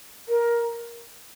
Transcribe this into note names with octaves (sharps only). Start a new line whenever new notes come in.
A#4